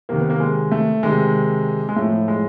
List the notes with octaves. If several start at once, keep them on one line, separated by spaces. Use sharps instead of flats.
C3 D#3 A#3
B3
A#3
G#3
A3
C3 D#3 G#3
G#3
A2 F3 A3
G#3